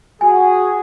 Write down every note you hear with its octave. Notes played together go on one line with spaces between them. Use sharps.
F#4 G#4 G#5